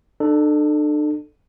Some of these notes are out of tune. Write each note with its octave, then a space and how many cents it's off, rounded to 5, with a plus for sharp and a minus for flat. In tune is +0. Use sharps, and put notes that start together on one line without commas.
D4 +40 A4 +0